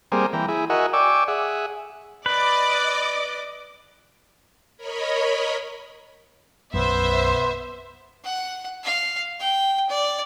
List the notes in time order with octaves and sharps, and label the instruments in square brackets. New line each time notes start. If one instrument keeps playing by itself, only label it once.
[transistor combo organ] G3 A#3 C4 G#4
E3 G5 A#5
E4 G#4
F#4 A#4 D#5 E5 F#5 G#5
D5 G5 G#5 C#6 D6 E6
G#4 E5 F#5
[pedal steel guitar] B4 [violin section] D5 D#5 D6
[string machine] A#4 C#5 D#5 B5
[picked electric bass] B1 F#2 [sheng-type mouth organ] B3 [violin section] C5 E5
[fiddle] F#5
F5
G5
D5